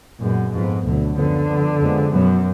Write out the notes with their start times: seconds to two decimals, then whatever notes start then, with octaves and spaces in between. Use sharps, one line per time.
0.20 F#2 A#2 G#3 B3
0.52 F2 G#2 F3 B3
0.84 D2 B2 D3 F#3
1.16 F#2 D3 F3 B3
1.48 F2 F3 B3
1.79 F2 F3 G#3 B3
2.12 F#2 B2 F#3 B3